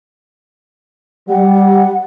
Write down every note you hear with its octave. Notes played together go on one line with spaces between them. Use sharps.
G3 F#5